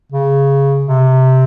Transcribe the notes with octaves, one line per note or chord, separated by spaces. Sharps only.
C#3
C3